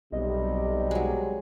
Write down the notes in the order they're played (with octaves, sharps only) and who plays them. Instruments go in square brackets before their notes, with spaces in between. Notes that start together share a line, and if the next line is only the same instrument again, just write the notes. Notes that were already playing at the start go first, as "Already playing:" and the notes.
[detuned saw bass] B1 [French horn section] C3 G3 [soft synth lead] D#5
[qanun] F#3 G#3